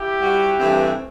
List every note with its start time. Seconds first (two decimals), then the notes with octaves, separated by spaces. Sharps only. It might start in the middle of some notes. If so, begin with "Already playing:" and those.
Already playing: E4 G4
0.19 G3 C4 F#4
0.59 G2 E3 A3 C4